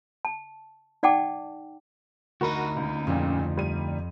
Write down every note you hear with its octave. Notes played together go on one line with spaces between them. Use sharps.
A5
D#4 D5 F#5 G5 A5 D6
D2 D#4 F#4 A#4 B5
C#2
F2 A#2 C#3
G3 D#7